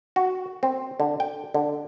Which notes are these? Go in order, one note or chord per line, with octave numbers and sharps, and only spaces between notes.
F#4
C4
D3
G5
D3